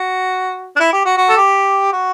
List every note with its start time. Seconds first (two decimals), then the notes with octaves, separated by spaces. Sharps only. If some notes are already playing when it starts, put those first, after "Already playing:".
Already playing: F#4
0.76 D4
0.80 E4
0.93 G4
1.05 F#4
1.17 F#4
1.29 A4
1.37 G4
1.92 F#4